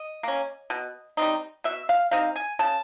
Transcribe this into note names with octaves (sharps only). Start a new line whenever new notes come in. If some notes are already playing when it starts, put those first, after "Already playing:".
Already playing: D#5
A#3 C#4
B2
G3 C4 D#4
B2 E5
F5
G3 C4 D#4 F5
G#5
C#3 A5